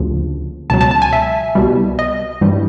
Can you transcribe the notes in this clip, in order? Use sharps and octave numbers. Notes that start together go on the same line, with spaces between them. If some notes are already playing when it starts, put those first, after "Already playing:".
Already playing: D2 C#3 F3 A#3 D4
C#2 B2 F#3 A5
A5
A5
G#5
E5
C2 B2 G3
D#5
G2 E3 G3